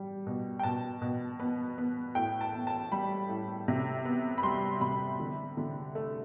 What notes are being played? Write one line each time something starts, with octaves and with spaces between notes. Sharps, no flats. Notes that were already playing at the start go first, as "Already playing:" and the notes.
Already playing: G3
B2
G5
B2 A5
B2
B3
B3
A2 G5
A5
B3
A5
G3 B5
A2
C3
B3
B5
G3 C6
C3 B5
D3
D3
A3